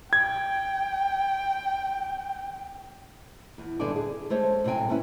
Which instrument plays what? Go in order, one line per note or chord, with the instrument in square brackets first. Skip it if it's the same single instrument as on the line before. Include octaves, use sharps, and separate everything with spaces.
[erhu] G5 [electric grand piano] G#6
[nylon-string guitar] E2
G2 D3 B3 E4 D5 G#5
G#4
G#3 A3 C5 C#5
A2 C3 F#3 G5 G#5
B3 C#4 E4 B4